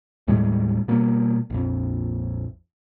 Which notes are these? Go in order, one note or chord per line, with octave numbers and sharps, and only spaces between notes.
D#2 A2 G3 G#3
B2 G3 A#3
A#1 F2